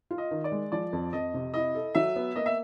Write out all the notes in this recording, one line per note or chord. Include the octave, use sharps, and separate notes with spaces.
F4
D#5
D#3
D5
G#3
F3 D5
F2
F2 D#5
C3
E4 D#5
A4
F#3 E5
B3
A#3 D#5
E5